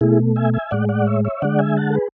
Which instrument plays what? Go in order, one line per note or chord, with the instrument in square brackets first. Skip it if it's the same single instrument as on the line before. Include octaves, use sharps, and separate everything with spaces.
[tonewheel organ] B2 A3 E4 G#4
E5 G#5
E5 G#5
A2 G#3 D5 F#5
D5 F#5
C#5 E5
C#5 E5
D3 G#3 D5 F#5
E5 G#5
F#5 A5
A4
G#4 B4